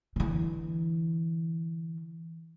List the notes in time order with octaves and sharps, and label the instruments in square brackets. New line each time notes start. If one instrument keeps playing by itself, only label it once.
[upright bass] D3 E3